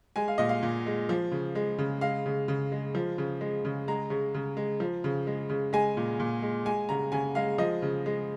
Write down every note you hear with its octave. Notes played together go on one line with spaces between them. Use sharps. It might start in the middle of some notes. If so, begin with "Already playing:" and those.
G#3 G#5
F5
A#2 D#5
F5
A#2
G#3
F3
C#3
G#3
C#3
G#3 F5
C#3
C#3
G#3
F3
C#3
G#3
C#3
G#3 A#5
C#3
C#3
G#3
F3
C#3
G#3
C#3
G#3 G#5
A#2
A#2
G#3
G#3 G#5
C#3 A#5
C#3 G#5
G#3 F5
F3 D#5
C#3
G#3